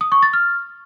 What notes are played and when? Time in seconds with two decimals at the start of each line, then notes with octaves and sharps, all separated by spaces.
0.01 D#6
0.12 C#6
0.23 A6
0.33 F6